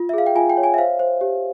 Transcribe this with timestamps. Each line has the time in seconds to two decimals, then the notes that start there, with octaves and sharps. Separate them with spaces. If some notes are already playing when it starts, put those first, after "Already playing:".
Already playing: F4
0.09 E5
0.13 G#4 F5
0.26 G5
0.35 F4 G#5
0.50 G5
0.57 C#5
0.63 G#5
0.74 E5
0.78 C5 F5
0.99 C5
1.21 G4